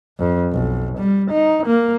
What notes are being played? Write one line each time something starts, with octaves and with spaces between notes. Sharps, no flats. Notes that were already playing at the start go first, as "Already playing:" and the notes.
F2
B1
G3
D#4
A#3